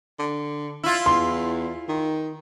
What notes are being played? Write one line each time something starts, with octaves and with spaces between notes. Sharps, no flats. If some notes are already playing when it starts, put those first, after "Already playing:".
D3
E4 F4
E2 C6
D#3